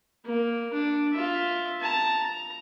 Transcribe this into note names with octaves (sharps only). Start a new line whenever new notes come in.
A#3
D4
F4 E5
A5 A#5
A#5